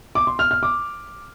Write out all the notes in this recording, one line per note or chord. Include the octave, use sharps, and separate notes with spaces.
D6
C6
F6
F6
D6